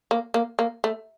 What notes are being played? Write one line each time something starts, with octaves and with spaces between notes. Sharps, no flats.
A#3
A#3
A#3
A3